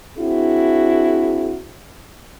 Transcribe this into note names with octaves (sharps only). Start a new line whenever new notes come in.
C4 D4 E4 F#4 G#4